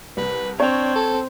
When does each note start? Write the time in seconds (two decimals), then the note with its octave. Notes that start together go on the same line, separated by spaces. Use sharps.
0.17 C2 B4
0.60 C4 D4 C#5 F7
0.95 A4